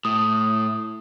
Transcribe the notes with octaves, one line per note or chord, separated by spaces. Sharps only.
A2 D#6